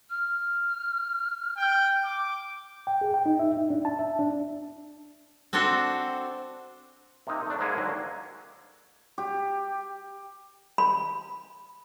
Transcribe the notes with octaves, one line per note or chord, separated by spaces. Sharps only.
F6
G5
D6
G5
G#4
G5
D#4
E5
D#4
D4
A5
E5
D4
C4 D4 F#4 A4 C5
C3 A#3 D#4
A3 D4
G#2 G#3 A#3 E4 G#4
D#2 D3 F#3
G4
B5